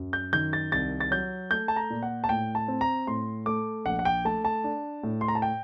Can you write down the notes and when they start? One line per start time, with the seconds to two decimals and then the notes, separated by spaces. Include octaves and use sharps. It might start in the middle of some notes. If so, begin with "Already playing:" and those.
Already playing: F#2 F#3
0.13 G6
0.33 D#3 G6
0.53 A6
0.72 C2 A6
1.00 A6
1.11 F#3 G6
1.51 A3 G6
1.68 A5
1.76 A#5
1.90 A#2
2.03 F#5
2.24 A5
2.29 A2 G5
2.55 A5
2.68 C4
2.81 A#5
3.07 A2 C6
3.46 A3 D6
3.85 A#1 F#5
3.99 F#5
4.05 G5
4.25 A3 A5
4.45 A5
4.64 D4
5.03 A2
5.21 C6
5.28 A#5
5.35 A5
5.42 G5